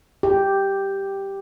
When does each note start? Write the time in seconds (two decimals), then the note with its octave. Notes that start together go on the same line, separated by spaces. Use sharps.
0.23 G4